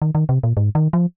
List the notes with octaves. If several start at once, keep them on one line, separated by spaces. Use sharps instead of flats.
D#3
D#3
C3
A#2
G#2
D#3
F3